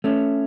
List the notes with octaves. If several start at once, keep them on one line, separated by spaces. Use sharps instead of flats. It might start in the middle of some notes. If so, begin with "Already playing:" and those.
A3 C#4